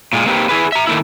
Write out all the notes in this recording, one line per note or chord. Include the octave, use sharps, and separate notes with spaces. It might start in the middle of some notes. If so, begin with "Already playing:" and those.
A#2 G#3
A#3 C4 D#4 G4 B4
E4 G#4 B4
E5 A#5
D#3 A3 A#3 E4